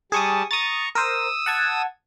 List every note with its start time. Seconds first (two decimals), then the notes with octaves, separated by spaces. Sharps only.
0.12 G3 G#4 A5 C#6 D#6
0.51 A#5 C#6 D#6 A6
0.95 A#4 C5 D#6 E6
1.46 F#5 A5 G#6